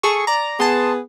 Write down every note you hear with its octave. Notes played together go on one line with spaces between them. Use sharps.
G#4 A4 C#6
D5 A#5
B3 G#4 A5 C6